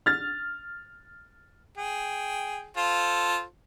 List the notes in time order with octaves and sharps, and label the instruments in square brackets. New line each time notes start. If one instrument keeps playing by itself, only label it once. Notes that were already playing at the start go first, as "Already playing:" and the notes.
[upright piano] F6 A6
[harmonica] G#4 G5
F4 A4 C5